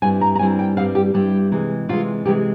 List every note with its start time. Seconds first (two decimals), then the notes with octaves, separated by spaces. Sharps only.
0.02 G2 G3 C4 E4 G#5
0.21 A#5
0.35 A#5
0.39 G2 G3 C4 E4 G#5
0.59 G5
0.77 G2 G3 C4 E4 F5
0.95 G4
1.14 G2 G3 C4 E4 G4
1.52 C3 E3 G#3
1.89 C3 E3 G#3 F4
2.25 C3 E3 G#3 G4